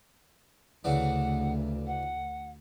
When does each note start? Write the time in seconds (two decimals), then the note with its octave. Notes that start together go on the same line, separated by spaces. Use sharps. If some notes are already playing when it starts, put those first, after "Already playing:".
0.84 D2 C#3 E3 D4 F#5
1.86 F#5